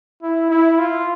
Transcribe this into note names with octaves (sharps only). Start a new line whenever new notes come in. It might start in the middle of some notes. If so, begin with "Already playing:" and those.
E4
E4
F4